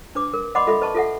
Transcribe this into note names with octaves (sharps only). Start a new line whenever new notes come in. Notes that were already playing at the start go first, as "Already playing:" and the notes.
D4 B4 D6
A#4
D5 D#5 F#5 B5 C6 D6
F4 A4 D#5 E5 B5
B4 D#5 A5 C#6
F4 A4 E5 F#5